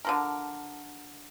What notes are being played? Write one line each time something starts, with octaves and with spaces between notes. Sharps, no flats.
D3 F3 A#4